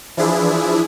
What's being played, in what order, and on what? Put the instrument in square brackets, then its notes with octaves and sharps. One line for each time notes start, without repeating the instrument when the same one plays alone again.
[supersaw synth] E3 F3 D4 E4 G#4